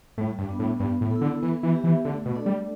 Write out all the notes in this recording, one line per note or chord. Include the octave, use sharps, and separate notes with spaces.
A2 G3
G2
B3 D4
A2
G2 B3
A2
E4 A4
D3
E3 B3
E3
G4 E5
E3
D3 A3
B2
D4 A4 D5
G3